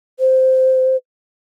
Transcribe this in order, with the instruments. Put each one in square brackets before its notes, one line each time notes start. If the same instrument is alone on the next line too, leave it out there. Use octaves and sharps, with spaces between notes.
[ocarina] C5